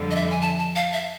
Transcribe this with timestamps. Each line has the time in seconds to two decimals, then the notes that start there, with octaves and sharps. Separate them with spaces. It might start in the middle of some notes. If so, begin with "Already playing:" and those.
Already playing: F2 D3 G3
0.11 D#5
0.16 E5
0.30 G#5
0.41 A5
0.59 A5
0.76 F5
0.93 E5